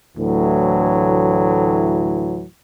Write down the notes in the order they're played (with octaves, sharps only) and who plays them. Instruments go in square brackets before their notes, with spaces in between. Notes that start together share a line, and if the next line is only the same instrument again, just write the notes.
[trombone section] D2 A2 E3 F#3